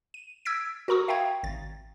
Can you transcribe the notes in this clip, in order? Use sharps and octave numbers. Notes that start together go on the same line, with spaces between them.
D#7
E6 G#6 A6 B6 D7
F#4 A#4 A#5 C#6 D#6
E5 F5 G5 A#5 G#6
G#1 A6